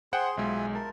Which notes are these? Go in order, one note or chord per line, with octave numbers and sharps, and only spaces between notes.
G#4 C5 F#5 G5 C6
B1 G#3 F4 E5 G#5
A#4 A5